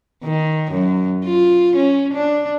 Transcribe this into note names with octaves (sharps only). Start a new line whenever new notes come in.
D#3
F#2
F4
C#4
D4